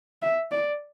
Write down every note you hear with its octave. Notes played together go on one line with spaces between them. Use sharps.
E5
D5